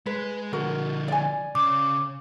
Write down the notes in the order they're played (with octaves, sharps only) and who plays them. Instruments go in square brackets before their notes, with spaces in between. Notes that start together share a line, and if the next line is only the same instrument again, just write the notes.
[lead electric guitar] G#3 [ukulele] B4
[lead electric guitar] D3 F3 [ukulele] F#4 A#4
[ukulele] D5 G#5
[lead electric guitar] C#3 [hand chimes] D6